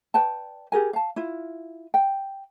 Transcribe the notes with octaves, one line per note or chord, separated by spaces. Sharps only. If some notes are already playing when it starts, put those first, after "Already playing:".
B4 D5 G5 A5
G4 G#4 A#4 G#5
F5 A5
E4 F4
G5